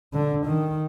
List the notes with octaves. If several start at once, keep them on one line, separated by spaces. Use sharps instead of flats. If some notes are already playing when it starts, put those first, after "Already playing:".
D3
D#3